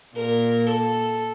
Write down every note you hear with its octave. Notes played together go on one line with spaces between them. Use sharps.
A#2 A#4
A4